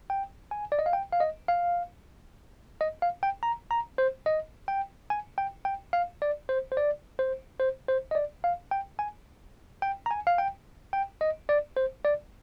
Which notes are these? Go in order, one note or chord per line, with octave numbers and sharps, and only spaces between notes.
G5
G#5
D5
D#5
F5
G5
F5
D#5
F5
D#5
F5
G5
A#5
A#5
C5
D#5
G5
G#5
G5
G5
F5
D5
C5
C5
D5
C5
C5
C5
D#5
D5
F5
G5
G#5
G5
A#5
G#5
F5
G5
G5
D#5
D5
C5
D5